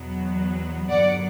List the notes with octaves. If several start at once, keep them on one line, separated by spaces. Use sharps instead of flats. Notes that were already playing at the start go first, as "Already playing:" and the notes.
Already playing: E2 B2 F#3 B3
G2 D3 F#3 B3 D5 F#5